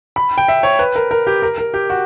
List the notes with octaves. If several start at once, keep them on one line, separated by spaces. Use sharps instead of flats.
B5
G5
E5
C#5
B4
A#4
A#4
G4
A#4
A#4
G4
F#4